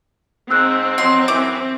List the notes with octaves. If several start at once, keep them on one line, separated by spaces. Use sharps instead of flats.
G#2 C4 E6 F#6
F3 F#3 D#4 C6
F#2 E3 D6